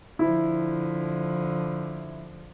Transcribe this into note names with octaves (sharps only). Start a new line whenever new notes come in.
D3 F3 E4